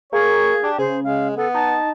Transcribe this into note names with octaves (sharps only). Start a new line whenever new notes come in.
A#3 G#4 C#5
D4 G4
C#3 G#4 C5
G#3 F5
B3 A4
D#4 A5